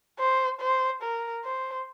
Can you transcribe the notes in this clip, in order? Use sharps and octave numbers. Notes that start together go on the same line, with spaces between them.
C5
C5
A#4
C5